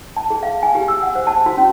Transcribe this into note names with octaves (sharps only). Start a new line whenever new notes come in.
A5
G#4
F5
G#5
G4
E6
F#5
C5
A5
F#4
C#4